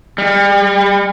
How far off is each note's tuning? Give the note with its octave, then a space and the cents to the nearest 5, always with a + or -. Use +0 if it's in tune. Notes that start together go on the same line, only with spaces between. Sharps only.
G3 +35